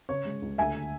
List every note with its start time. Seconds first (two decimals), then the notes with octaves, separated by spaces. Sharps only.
0.09 C#3 C#5
0.25 G#3
0.42 C#2
0.58 D2 E5 G#5
0.75 D3